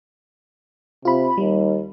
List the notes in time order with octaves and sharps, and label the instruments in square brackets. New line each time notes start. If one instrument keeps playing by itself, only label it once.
[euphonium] C3 [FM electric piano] F4 B5
[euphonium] D#2 [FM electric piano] G3